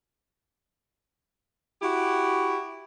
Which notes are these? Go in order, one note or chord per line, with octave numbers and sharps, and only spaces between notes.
E4 F#4 G4